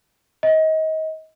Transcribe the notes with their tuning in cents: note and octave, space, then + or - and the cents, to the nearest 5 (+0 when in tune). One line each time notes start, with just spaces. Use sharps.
D#5 +30